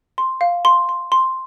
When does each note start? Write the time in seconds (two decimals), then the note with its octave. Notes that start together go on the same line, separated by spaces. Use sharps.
0.18 C6
0.41 F5
0.65 C6
0.89 C6
1.12 C6